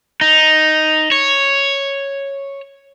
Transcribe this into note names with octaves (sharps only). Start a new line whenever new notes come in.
D#4
C#5